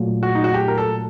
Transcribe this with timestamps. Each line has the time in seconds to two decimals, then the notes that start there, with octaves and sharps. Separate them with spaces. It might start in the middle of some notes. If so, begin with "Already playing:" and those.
Already playing: A#2 F#3 A3
0.23 F#4
0.35 D#4
0.44 F#4
0.54 G4
0.68 A#4
0.78 A4